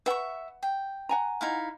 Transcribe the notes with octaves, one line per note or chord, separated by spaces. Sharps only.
B4 E5 F#5 C#6
G5
F#5 G#5 A#5
D#4 E4 F5